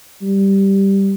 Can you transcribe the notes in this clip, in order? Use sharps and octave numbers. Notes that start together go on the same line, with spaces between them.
G3